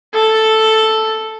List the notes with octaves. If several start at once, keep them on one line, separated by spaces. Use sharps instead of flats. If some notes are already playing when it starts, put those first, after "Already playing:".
A4